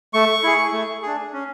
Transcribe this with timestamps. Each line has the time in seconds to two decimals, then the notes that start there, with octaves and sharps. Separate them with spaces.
0.14 A3 C#6
0.44 E4 G#4
0.73 A3
1.02 D4 G#4
1.33 C#4